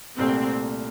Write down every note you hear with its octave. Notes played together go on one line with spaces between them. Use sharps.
C2 A#2 A3 C4